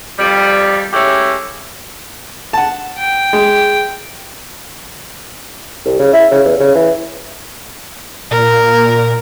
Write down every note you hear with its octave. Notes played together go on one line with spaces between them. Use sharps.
F2 G3
G#3 A3 C#4 E4 G4
F#5 A5
G5
G#3
C2
C#3
E4
C#3
E2
C#3
E3
A#2 A#4